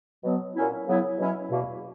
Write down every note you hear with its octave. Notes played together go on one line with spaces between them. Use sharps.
B2 F#3 B3
A#2 F#3 C#4 E4
C#3 F#3 B3 E4
B2 F#3 C#4 E4
E2 B2 A#3